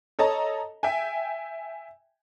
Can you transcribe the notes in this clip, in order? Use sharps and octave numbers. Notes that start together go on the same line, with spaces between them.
A4 C#5 D#5 A5 A#5
E5 G5 G#5